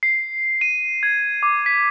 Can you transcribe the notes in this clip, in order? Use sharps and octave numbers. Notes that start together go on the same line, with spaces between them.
C7
D#7
G#6
D6
B6